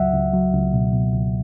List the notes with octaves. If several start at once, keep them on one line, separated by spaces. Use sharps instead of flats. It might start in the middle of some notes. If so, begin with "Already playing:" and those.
Already playing: C#2 F#3 E5 F#5
C#2
F#3
C#2
B2
B2
C#2